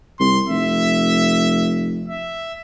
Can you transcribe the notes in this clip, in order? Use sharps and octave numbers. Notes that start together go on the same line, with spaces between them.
C2 C6
F1 E5
E5